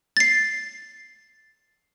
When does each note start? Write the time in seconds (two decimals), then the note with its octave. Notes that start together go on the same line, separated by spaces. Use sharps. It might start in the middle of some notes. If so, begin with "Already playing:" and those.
0.17 A6 C7